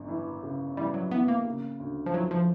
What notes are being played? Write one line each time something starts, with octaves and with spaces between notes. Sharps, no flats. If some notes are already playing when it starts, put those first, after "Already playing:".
Already playing: G1 F#2
E3
C#3
E3 G3
F#3
E3 B3
A#3
C#3
D2
F3
E3 F#3
F3